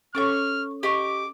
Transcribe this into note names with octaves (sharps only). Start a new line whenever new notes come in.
C#4 A4 C#5 C#6 D6 F6
G4 D#5 C#6 D6